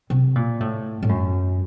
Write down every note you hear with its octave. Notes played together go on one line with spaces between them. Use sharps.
C3
A#2
A2
A2
F#2